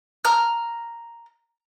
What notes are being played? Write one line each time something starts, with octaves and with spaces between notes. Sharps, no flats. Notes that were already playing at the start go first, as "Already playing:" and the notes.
A#5 F6